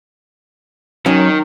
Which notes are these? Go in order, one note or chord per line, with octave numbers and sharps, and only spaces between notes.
D#3 F#3 C#4